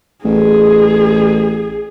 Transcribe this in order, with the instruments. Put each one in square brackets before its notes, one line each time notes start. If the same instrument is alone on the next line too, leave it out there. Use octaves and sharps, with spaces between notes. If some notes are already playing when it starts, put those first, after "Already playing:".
[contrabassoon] A1 [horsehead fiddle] G#4